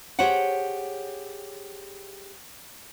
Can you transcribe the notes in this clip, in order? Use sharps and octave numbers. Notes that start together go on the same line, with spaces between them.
G4 G#4 C5 C#5 F#5